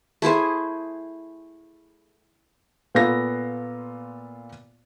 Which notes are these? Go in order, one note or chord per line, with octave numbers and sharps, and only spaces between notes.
A3 E4 G#4 C5
A#2 B3 F4 A4 A#6